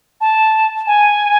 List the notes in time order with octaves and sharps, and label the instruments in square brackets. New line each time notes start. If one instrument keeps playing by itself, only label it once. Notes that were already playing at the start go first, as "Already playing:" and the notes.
[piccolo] A5
G#5